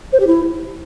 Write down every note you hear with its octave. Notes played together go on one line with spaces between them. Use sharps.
C5
G4
E4